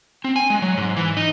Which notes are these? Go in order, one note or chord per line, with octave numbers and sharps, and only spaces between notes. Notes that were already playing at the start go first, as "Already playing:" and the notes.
C4
G#5
G#3
F#3
G#2
E3
D#4